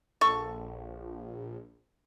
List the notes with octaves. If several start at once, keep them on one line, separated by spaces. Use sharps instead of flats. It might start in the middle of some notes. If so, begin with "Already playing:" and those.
A#1 A4 C#6